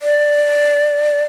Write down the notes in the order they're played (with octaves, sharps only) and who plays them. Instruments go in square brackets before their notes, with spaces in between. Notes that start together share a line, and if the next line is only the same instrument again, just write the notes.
[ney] D5